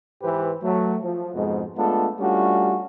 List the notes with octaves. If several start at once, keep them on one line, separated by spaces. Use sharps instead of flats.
G#2 E3 G4 B4 C5
F#3 A3
F3
F2 G#2 B2 G#3
G#3 A3 B3 D4 F4 A4
G3 A3 C#4 D4 F4 F#4